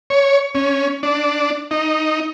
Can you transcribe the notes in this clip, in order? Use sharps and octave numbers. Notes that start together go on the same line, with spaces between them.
C#5
C#4
D4
D#4